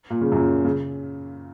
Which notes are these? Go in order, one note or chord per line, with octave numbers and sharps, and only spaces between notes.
A#2
C#3
F#2 A#2
C#3